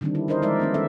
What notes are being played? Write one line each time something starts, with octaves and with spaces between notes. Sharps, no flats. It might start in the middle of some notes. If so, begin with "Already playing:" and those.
D3 D#3 G3 C4 D4
E4
D4 D#4 A#4 C5 D#5
F3 G#3 D#4 A#4 D5 E5
B3 C#4 D#4
D#3 C#4 A4 E5